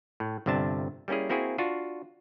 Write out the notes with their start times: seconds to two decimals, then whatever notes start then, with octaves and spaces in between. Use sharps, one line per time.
0.20 A2
0.46 G1 G2 C3 D4 A5
1.08 G3 A#3 C#4 E4 G#4
1.29 A#3 C4 E4 F#4 G#4
1.58 D4 F4 F#4